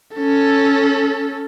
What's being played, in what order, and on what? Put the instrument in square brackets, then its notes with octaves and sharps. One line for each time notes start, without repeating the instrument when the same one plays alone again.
[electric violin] C#4 A4